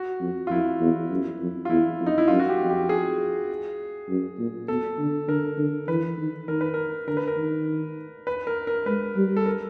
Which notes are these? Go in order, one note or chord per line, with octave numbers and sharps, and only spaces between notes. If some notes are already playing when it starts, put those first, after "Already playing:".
Already playing: F#4
F2
F4
F2 E4
E2
F#2
F2
F4
E2 E4
F2
D#4
E4
F#2 F4
F#4
G4
F2
G4
G#4
F#2
A#2
B2 A4
D3
D3 A#4
D3
E3 B4
D#3
D#3 A#4
B4
A#4
D3 A#4
B4
A#4
D#3
B4
A#4
A#4
G#3 B4
G3
A4
A#4